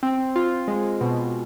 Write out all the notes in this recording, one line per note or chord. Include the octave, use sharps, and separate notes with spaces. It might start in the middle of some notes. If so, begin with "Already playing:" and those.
C4
F4
G#3
B2